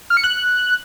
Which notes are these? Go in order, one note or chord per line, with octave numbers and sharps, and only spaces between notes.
F6
C#7
F#6